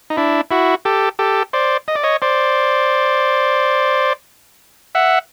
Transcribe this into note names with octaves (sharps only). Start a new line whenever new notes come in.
D#4
D4 E4
E4 F#4
G4 A4
G4 A4
C5 D5
D#5
D5
C#5 D#5
C5 D5
E5 F#5